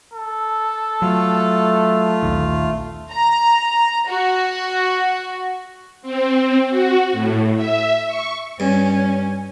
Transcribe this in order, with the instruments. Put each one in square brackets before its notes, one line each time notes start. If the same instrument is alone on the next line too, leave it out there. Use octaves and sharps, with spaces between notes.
[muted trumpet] A4
[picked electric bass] F#3 [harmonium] A3 [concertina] F4
[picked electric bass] A#1 D#2 D#3
[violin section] A#5
F#4
[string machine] C4
F#4
A2
E5
C#6
[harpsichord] G2 [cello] C#4